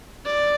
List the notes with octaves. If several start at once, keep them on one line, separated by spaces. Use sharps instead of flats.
D5